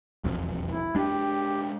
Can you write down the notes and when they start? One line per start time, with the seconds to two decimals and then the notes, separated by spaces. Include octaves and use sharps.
0.24 E1 B1 F2
0.71 E4
0.95 G#3 D4 G4